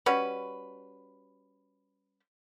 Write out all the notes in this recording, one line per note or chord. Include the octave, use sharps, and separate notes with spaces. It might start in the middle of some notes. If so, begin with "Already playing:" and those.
G3 C#4 F#4 B4